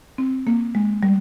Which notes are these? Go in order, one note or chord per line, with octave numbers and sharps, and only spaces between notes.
C4
A#3
G#3
G3